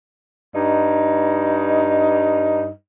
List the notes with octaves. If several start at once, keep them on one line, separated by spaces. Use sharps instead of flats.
G2 D#4